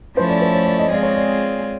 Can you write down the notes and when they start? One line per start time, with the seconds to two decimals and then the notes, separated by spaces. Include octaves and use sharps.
0.16 F3 A3 C#4 E4 A4 C5
0.29 D5
0.41 C5
0.53 C#5
0.66 D5
0.79 D#5
0.90 G#3 C4 F4 G#4 D5
1.03 C#5
1.16 D5